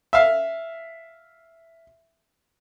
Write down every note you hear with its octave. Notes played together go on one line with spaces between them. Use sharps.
E5 F5